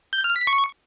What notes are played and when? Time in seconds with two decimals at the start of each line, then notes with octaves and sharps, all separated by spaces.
0.13 G6
0.24 F6
0.36 B6
0.47 C#6